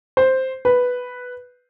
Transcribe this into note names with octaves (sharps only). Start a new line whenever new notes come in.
C5
B4